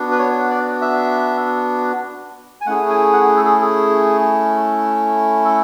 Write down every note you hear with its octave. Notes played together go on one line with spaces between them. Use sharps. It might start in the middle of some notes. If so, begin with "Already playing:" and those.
Already playing: B3 D4 F#4
B4
C#5
D5
E5
G#5
A3 C#4 E4 G#4 F#5
G#5
F#5
A4
G#4
G#4
A4